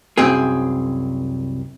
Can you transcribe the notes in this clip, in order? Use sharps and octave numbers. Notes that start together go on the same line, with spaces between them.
C2 F#2 C4 G#4